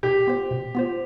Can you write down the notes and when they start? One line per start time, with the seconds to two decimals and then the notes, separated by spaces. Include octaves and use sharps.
0.03 B2 G4
0.27 B3 F4 C5
0.51 B2
0.75 B3 F4 C5